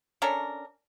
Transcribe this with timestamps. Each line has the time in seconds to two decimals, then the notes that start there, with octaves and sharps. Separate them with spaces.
0.22 C#4 D4 A4 A#4